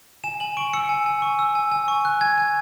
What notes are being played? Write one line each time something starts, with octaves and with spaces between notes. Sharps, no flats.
G#5 E7
G#5 F#7
C#6 D7
E6 C#7
G#5
G#5
C#6
E6
G#5
G#5
C#6
F#6
G#5 G#6
G#5